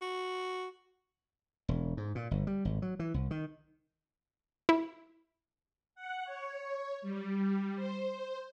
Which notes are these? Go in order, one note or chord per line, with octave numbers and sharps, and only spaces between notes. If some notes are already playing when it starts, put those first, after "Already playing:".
F#4
E1
G#2
A#2
G1
G3
G#1
F#3
E3
C2
D#3
E4
F#5
C#5
G3
C5